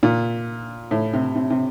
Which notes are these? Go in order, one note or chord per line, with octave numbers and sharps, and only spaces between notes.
A#2
A2
C3
C3
C3